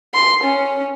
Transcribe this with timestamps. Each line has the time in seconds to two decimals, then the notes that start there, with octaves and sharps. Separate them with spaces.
0.14 C6
0.44 C#4